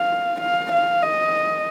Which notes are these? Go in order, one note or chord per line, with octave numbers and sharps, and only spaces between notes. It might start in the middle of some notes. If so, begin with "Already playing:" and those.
Already playing: F5
F5
F5
D#5